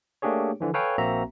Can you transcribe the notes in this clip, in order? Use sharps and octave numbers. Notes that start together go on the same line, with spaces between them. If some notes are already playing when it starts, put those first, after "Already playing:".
A3 A#3 D4 G4 G#4 C#5
D3 E3 F3
A4 B4 C#5 F5 G5 G#5
A#1 A#3 C4 F#4 E5 A#5